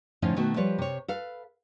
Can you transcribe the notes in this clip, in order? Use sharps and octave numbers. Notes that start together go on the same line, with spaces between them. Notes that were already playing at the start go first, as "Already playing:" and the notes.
A2 D3 F3 C#4 D#4 F5
B2 D#3 A3 B3 F#4
F3 G3 B4 C#5
C3 C#5
A4 B4 F5